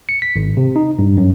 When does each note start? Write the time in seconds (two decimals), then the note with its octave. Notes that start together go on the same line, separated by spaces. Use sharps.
0.09 C#7
0.22 B6
0.36 G#1
0.57 C3
0.76 D#4
0.99 G2
1.17 F#2